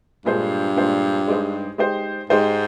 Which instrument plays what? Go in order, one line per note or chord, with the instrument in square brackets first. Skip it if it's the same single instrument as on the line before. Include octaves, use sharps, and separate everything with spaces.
[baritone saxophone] G2 [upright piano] A#2 G#3 D4 G#4 C5
[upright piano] A#2 G#3 D4 G#4 C5
G#3 D#4 G4 C5
G#3 D#4 G4 C5
[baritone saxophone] G#2 [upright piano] G#3 D#4 G4 C5